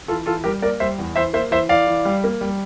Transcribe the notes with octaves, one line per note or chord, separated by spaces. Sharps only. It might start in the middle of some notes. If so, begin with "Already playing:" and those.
E3 F4 A4
E3 F4 A4
G3 G4 A#4
A#3 A#4 D5
G3 C5 E5
E2
E3 C5 E5
A#3 C5 E5
E3 C5 E5
E3 D5 F5
E3
G3
A#3
G3